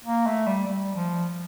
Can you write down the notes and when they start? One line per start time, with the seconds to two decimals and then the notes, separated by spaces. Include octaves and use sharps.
0.05 A#3
0.27 A3
0.47 G3
0.68 G3
0.96 F3